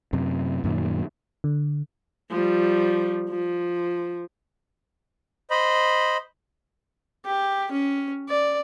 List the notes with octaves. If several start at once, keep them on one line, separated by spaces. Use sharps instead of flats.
F#2 C3
F#2 A#2 D#3
D3
F3 G3
F3
C5 D#5 B5
G4
C#4
D5